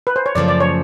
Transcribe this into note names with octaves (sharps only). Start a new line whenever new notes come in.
B4
C5
C#5
F#2 C#3 F3 A3 D5
D5
C#5